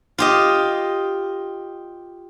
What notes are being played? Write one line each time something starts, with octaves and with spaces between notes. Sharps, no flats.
F4 G4 D#5